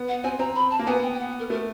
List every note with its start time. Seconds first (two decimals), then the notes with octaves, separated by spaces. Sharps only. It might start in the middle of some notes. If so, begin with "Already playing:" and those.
Already playing: B3
0.08 F#5
0.24 C4 G#5
0.39 C4 A#5
0.56 B5
0.71 A5
0.79 A#3
0.87 B3 G#5
1.03 G5
1.14 G5
1.19 F#5
1.39 A#4
1.50 A3 A#4